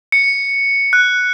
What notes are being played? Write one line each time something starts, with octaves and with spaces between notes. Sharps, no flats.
C#7
F#6